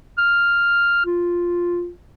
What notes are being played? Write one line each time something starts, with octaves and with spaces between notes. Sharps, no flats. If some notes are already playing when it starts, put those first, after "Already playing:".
F6
F4